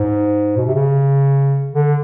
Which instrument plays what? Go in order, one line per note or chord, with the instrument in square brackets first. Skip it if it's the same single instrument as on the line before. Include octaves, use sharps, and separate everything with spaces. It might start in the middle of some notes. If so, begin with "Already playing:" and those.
Already playing: [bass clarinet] G#2
B2
C3
C#3
D3